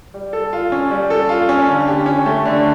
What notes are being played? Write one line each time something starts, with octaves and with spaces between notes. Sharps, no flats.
G3
A4
F4
C#4
G3
A4
F4
C#4
D3
G4
C#4
A3
D3